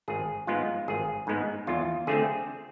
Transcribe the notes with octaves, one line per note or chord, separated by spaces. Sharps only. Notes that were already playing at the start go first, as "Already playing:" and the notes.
G#1 G#4
G#2 G#3 B3 F4
G#1 G#4
G#2 G#3 B3
E2 F4
D3 A3 C4 G#4